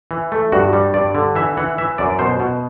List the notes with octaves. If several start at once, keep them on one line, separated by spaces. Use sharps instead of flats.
E3
A3
G2 F#4
G3
G2 D5
D3
E3 E5
E3 F#5
E3 E5
F#2 D5
B2 C5
B2